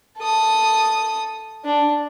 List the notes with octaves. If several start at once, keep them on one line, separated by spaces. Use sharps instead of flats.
A4 D#6
D4